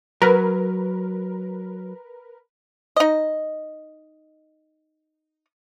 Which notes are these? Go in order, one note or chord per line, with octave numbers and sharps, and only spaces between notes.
F#3 A#4 B4
D#4 D#5